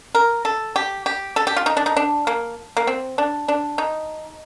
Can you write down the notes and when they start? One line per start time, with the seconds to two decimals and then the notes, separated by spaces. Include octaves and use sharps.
0.15 A#4
0.45 A4
0.76 G4
1.06 G4
1.36 A4
1.47 G4
1.56 F4
1.66 D#4
1.77 D4
1.86 D#4
1.97 D4
2.27 A#3
2.77 A#3
2.87 C4
3.18 D4
3.48 D4
3.78 D#4